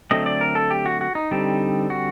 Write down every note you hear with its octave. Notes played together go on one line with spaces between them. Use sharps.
D3 F#3 A3 C4 D#5
D5
A#4
A4
G4
F#4
F#4
D#4
D3 G3 C4
F#4